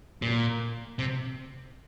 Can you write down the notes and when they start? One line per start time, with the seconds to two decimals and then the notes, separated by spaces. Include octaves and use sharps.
0.22 A#2
0.99 C3